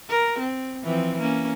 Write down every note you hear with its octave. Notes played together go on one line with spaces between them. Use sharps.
A#4
C4
E3 F3 C4
A#3 C#4